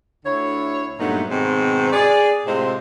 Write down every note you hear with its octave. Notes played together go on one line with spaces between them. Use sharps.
D2 D3 E4 C#5
G2 A#2 F#3 A3 B3 D#4
G#2 B2 D#3 C4
G#4 D5
A2 C3 G#3 C4 F4 C5